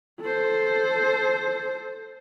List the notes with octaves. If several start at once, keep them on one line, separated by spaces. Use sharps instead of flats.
A4 C5